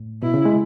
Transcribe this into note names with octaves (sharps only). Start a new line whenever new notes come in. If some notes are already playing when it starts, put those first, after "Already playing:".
Already playing: A2
B2 E4
C#3
G#3